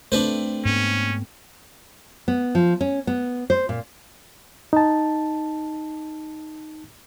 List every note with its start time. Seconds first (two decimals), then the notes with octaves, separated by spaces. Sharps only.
0.12 A3 C4 D4 B4 C5
0.65 G#2 B3 C#4
2.28 B3
2.55 F3
2.81 C#4
3.07 B3
3.50 C5
3.69 A#2
4.73 D#4 A5